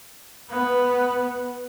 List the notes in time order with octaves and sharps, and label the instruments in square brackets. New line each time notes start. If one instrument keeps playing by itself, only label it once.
[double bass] B3